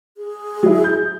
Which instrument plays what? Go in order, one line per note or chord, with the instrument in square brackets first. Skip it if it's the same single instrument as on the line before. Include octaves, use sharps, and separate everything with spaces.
[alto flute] G#4
[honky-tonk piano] F#3 E4
G6